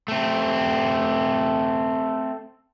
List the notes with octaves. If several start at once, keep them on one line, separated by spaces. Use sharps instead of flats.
A3 C4